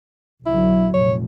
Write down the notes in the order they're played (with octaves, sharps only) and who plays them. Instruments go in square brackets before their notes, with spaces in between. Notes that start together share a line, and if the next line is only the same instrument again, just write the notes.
[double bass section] B1 D3 F#3 [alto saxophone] E4
[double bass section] F1 A#1 [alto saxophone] C#5